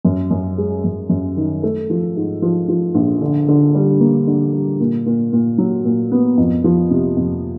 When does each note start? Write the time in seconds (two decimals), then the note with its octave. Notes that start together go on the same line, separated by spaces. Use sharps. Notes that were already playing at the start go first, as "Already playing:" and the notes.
0.05 F#2
0.31 F#2
0.58 G#3
0.84 F#2
1.09 F#2
1.36 D#3
1.63 A3
1.90 F3
2.16 G#2
2.42 F3
2.68 F3
2.94 A#1
3.22 D3
3.48 D3
3.75 G3
4.00 A#3
4.27 D3
4.53 G3
4.80 A#2
5.06 A#2
5.33 A#2
5.58 F#3
5.85 A#2
6.12 B3
6.38 F2
6.64 F3
6.91 C3
7.17 F2